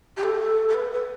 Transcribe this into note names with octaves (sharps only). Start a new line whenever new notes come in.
G4
A4
A4
B4
B4